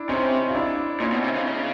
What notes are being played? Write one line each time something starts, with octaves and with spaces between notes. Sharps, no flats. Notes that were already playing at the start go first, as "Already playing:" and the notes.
Already playing: D4 E4
C3 C#4 D#4
F4
D4 E4
A#2 C#4 D#4
B2
C3
C#3
C#3